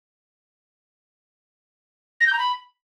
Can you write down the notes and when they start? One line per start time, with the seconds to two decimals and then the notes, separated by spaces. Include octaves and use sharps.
2.20 A#6
2.27 G6
2.33 A#5
2.39 B5